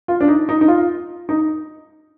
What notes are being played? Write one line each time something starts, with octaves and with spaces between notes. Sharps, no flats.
F4
D4
D#4
D#4
D#4
F4
D#4